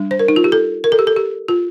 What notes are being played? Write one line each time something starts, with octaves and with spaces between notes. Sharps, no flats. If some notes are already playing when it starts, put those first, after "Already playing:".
Already playing: G3 D4
C5
A#4
D#4
F4
G4
A4
A#4
A4
G4
A4
G4
F4